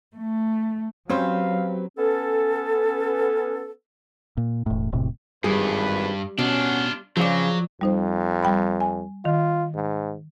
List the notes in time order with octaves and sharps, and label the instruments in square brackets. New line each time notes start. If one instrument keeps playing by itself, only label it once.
[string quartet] A3
[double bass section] F#3 [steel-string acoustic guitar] C4 G4 B4 [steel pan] C#4 C5 [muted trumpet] F5
[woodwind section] B3 C#4 A4
[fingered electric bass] A#2
E1 A2
E1 A2 C3
[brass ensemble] G#1 E2 B4 [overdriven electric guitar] G2 [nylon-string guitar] G3 [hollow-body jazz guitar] G#4
[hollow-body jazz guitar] B2 [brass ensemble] C#4 F#5 [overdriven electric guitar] D4 F4
[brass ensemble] C#3 C4 [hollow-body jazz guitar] F3 D5 [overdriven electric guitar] F#3 [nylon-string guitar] G#4 C5 F5
[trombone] F2 [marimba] G3 D#4 C5
[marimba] G3 G5 B5
G#5
[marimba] D#3 [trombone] F4
[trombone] G#2